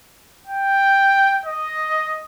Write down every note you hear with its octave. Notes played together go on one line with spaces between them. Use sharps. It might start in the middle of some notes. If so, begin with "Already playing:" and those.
G5
D#5